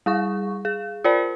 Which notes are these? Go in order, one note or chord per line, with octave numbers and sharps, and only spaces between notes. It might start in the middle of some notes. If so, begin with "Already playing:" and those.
G3 G#4 C#6
G#4
F4 A#4 C5 D5